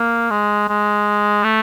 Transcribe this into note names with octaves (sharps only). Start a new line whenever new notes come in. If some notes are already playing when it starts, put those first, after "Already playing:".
Already playing: A#3
G#3
G#3
A3